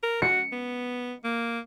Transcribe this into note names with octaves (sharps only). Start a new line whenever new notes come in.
A#4
F#4 C#7
B3
A#3